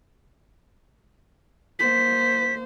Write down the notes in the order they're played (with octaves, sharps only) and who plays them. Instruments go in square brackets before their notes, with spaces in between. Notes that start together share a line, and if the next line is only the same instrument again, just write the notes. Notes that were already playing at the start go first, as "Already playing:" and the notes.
[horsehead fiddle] A#3 C5 [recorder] B6